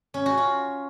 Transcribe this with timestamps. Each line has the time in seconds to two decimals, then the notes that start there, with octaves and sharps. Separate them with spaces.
0.14 C#4
0.26 F#4
0.37 F4